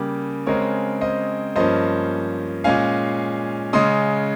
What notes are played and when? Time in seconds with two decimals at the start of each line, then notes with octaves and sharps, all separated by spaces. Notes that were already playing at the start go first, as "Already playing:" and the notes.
Already playing: C#3 G3 A#3 G4
0.47 C#3 G#3 C4 A#4 C#5
1.01 C5 D#5
1.56 G2 F3 A#3 C#4 C5 D#5
2.64 A#2 G#3 C#4 F5 G#5
3.73 C#3 G#3 C#4 C6 D#6